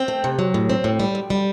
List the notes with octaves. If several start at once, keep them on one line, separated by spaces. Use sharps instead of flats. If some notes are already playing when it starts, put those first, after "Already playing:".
Already playing: C4 G5
A3
C3
F#3
A2
C4
A2
G3
D2
G3